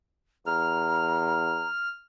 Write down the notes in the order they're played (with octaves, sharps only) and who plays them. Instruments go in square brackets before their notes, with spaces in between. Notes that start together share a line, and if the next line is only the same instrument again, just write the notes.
[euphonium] E2 [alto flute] A#5 [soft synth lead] F6